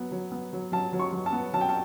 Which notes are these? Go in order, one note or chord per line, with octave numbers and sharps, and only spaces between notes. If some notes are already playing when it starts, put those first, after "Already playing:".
Already playing: F#3 B3
F#3
B3
F#3
F#3 A5
F#3
C#6
F#3
A5
B3
F#3 A5
G5
A5